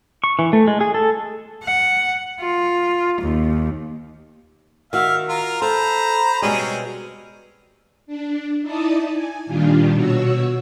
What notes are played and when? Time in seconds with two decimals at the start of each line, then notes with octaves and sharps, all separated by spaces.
0.24 C#6
0.39 E3
0.53 A3
0.68 G#3
0.81 G#4
0.94 A4
1.63 F#5
2.40 F4
3.21 D#2
4.93 D#3 F#4 E5 F5
5.29 F4 A#4
5.62 A4 C5 A#5 B5
6.42 B2 G3 G#3 C4 C#4 G#4
8.07 D4
8.62 D#4 E4 D5 A5 D#6
9.13 G#5
9.46 A#2 D#3 G3 D4 F4
9.93 B2 F#4 C#5 E6